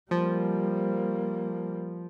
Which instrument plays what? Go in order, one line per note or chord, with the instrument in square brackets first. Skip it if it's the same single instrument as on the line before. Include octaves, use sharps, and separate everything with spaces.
[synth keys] F3 [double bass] G3 A#3